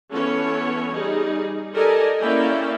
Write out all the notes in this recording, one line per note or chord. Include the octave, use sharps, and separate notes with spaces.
E3 B3 C#4 A4 C#5
G3 D#4 G#4
G4 A4 A#4 D5 D#5 G#5
A#3 C#4 E4 D5 F5 G5